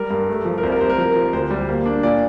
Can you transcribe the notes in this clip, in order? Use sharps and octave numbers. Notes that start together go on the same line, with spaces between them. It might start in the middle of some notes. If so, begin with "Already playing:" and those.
Already playing: G3 A#4
G2
A3
F3
A#4
C2 C5
A#4
C2 C5
A#4
F3
F3
D2 C5
G3
A#3
D4
A#2 D5